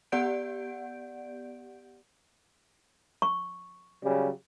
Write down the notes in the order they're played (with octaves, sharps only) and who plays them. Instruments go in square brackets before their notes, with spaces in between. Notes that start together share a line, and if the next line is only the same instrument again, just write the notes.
[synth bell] B3 G4 D5 F#5 G6 D7
[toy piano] C#6
[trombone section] C#3 F#3 G3